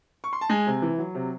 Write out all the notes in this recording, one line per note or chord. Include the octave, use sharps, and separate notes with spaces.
C#6
C6
A5
G#3 G#5
C3
E3
F#3
C3